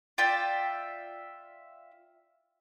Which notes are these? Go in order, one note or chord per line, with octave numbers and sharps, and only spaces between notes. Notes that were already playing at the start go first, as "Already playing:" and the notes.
F4 D5 E5 G5